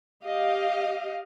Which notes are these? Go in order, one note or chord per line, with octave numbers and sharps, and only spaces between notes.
G4 D#5 F5